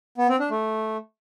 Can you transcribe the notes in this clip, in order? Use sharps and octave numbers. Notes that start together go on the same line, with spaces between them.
B3
C4
D4
A3